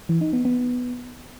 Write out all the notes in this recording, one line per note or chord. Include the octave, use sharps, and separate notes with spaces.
E3
D#4
B3
B3